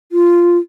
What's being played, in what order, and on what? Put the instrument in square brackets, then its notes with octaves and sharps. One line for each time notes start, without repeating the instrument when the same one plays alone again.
[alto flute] F4